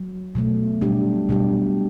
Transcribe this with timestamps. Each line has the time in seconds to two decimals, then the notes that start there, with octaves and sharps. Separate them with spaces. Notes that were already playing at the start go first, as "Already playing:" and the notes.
Already playing: F#3
0.35 B2 F#3 A3
0.81 B2 G3 D4 G4
1.29 B2 G3 D4 G4